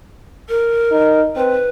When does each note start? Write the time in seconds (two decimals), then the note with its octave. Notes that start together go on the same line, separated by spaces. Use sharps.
0.49 A#4
0.91 D#4
1.36 C4 B4